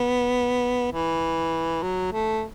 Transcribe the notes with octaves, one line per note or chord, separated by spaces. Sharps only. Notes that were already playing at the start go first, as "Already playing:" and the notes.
Already playing: B3
E3
F#3
A3